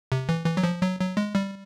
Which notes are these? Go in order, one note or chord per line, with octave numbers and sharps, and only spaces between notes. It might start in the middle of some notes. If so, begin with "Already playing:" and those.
C3
E3
E3
F#3
F3
F#3
F#3
G#3
G3